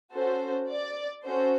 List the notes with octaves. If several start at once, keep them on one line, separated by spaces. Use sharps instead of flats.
C#4 F#4 A4 C5
D5
C#4 F#4 A4 C5